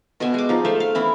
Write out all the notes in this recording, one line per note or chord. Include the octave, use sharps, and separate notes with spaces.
B2 D#5 E5 G#5
G#3 D6
F3 D#4
A3 C5 E5 F5
F5
E3 C#4 E4